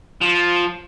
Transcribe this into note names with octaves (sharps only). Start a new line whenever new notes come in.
F3